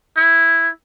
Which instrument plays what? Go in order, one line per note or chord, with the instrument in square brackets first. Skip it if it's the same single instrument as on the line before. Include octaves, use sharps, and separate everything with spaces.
[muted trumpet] E4